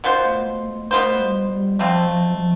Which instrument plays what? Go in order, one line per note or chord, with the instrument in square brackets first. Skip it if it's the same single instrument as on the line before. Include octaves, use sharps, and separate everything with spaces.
[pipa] B2 B3 F4 C5
[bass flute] A3
A3
A3
[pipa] B2 B3 F4 C5 [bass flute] A3
[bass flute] G3
G3
[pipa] B2 A3 C4 F4 [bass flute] F3
[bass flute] F3
G3
F3